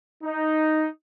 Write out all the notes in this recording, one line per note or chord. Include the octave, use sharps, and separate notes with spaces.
D#4